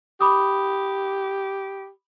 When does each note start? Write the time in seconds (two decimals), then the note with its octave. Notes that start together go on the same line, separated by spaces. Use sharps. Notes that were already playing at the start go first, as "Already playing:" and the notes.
0.21 G4 B5 D6 D#6